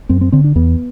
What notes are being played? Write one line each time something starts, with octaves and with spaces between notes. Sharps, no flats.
F#2 C4
C4
D3 C4
D4
E2 B3